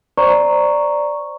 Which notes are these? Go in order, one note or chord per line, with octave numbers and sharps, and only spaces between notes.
C5 D5 A#5 C#6